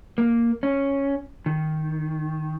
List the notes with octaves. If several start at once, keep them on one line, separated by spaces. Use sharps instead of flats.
A#3
C#4
D#3